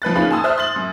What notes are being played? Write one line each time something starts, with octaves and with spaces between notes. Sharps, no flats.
F3 B4 F#6 A6
D#2 D#3 C#4 F4 G#4 B5
G#5 A5 C6 D#6 E6
C5 E5 F6 F#6
C6 A6 F#7
F#2